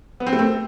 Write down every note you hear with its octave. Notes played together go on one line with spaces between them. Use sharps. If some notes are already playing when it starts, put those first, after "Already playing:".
B3
C4
A3
C4